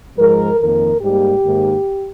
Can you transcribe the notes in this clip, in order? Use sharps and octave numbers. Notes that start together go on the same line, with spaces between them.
G#2 F3 G#3 A#4
F2 D#3 A#3 A#4
G#2 G3 A#3 G4
G#2 D#3 A#3